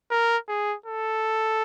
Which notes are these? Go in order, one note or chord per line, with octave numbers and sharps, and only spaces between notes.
A#4
G#4
A4